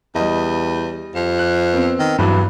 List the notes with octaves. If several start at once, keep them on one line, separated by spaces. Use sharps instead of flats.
E2 G3 D#5
F2
F#6
B3 C4
D#3
E2 G2 E3 F#3